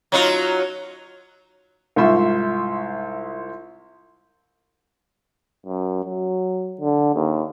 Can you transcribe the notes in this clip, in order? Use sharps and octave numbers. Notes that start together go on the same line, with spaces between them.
F#3 D#4 F4
C2 G#2 F4 E5 C6 C#6
F#2
F#3
D3
D#2